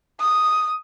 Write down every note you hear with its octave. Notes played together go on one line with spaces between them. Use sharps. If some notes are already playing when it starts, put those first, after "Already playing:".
D#6